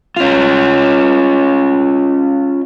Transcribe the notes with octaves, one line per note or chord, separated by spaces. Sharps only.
C#4 F4